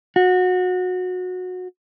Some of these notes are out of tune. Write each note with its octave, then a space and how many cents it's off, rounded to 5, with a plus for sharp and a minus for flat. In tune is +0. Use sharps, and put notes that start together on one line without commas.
F#4 -20